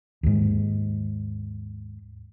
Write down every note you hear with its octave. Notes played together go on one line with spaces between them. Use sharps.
D#2 G#2